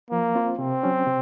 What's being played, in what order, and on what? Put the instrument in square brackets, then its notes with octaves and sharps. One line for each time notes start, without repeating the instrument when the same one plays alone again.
[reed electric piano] F3 [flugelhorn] A#3
[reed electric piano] C4 F4 C5
[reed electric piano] C3 [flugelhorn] C4
[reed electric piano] F#3 C#4
C3